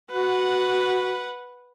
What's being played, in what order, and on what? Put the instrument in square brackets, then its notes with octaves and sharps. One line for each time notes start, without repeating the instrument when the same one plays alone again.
[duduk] F#4 [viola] B4 F#5